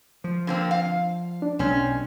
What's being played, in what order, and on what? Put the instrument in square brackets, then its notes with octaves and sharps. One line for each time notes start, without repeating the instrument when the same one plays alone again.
[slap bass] F3
[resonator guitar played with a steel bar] D3 A#3 C4
F5
[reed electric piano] D4
[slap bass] B1 [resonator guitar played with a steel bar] C4 C#4